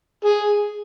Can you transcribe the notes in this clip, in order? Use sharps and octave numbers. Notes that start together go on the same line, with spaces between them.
G#4